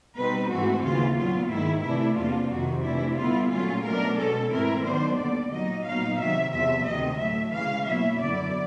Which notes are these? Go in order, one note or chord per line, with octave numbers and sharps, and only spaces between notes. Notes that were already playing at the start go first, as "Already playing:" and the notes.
B2 G3 C4 D#4 B4
G#2 E3 A3 C4 F#4
D#2 C#3 E3 F4
A#2 F#3 B3 F4
G#2 D#3 G#3 E4
C3 E3 A3 D4 E4
E2 C3 F3 A#3 D4 F4
F2 C3 D#3 F#4
C3 E3 A3 D4 E4
D3 G3 B3 E4 F4
A#2 F#3 A3 C#4 F4
B2 F#3 A3 D4 A#4
B2 G#3 C#4 A4
G#2 E3 A3 C4 E4 A#4
G#2 D#3 F#3 B3 D4 C5
D#2 D3 G3 B3 D5
A#2 F#3 A#3 D#4 D#5
A#2 F#3 B3 D#4 F5
C3 D#3 F#3 E5
E2 C3 F3 E5
D2 C3 D#3 D#5
A2 F#3 A3 E5
C#3 E3 G#3 C#4 F5
B2 F#3 A#3 C#4 E4 E5
F#2 D3 F#3 B3 E4 D5